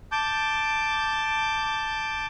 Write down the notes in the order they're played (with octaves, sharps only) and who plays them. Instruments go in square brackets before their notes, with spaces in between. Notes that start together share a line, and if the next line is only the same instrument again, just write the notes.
[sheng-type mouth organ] A5 D6 G6